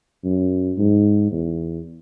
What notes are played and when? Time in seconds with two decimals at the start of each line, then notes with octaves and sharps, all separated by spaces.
0.24 F#2
0.78 G#2
1.32 E2